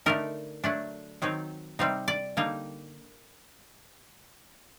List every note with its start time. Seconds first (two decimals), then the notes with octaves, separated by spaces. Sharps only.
0.06 D3 A3 D#4 A#4
0.64 F#3 A3 D4
1.22 D#3 F#3 C4 D#4
1.79 C3 G3 C4 D#4
2.08 D5
2.37 D3 G3 A#3 D#4